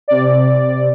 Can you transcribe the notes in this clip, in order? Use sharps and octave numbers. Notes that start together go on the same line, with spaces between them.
C3 D5